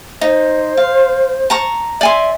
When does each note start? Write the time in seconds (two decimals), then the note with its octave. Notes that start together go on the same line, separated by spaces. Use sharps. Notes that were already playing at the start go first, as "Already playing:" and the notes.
0.21 D#4 C5
0.77 F5
1.50 A5 A#5 C#6
2.01 D5 E5 G#5 C6